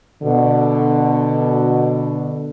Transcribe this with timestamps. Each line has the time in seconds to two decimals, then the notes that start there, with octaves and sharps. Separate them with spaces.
0.23 B2 D3